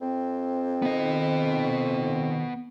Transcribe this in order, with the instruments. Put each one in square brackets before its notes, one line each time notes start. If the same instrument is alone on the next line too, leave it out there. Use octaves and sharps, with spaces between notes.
[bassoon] F2 [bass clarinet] C4
[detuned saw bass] D#3 [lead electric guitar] B3 D#5